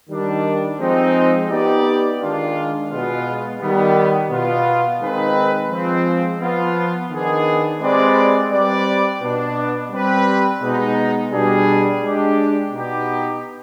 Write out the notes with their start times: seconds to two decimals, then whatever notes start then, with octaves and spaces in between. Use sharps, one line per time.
0.09 D#3 G3 D4
0.79 F3 G#3 C4 D#4
1.49 B3 D#4 G4 D5
2.19 D#3 G#3 D4 F4
2.89 B2 G#3 B3 F4
3.60 D#3 G3 B3
4.30 B2 B3 F4
5.00 D#3 G#3 C4 D#4 B4
5.70 F3 G#3 C4
6.40 F3 B3 F4
7.10 D#3 B3 D4 G#4
7.80 G#3 C4 G4 B4 D5
8.51 G3 C4 G4 B4 D5
9.21 B2 B3 D4
9.91 G3 C4 G4 B4
10.61 B2 G#3 B3 D#4
11.31 B2 G3 D4 G#4
12.02 G#3 D4 G4
12.72 B2 B3 D#4 G4